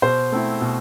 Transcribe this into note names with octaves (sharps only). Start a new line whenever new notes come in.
B2 C5
A3 C4 E4
B2